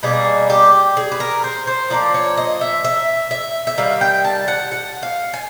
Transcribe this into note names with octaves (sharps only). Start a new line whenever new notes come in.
B2 G3 A#3 G#4
G4
G#4
B4
A#4
C5
C5
F3 A#3 D4 D5
C#5
D#5
E5
E5
E5
E5
D#3 G3 F5
G5
A5
F#5
F#5
F5
G#5